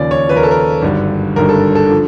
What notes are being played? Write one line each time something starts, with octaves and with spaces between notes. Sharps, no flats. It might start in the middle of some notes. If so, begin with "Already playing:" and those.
Already playing: D#2 C#3 F3 D5
C#5
D#2 C#3 F3 B4
A#4
A4
A#4
G#1 G2 D3 G3
G#1 G2 D3 G3 A#4
A4
A4
D3 F3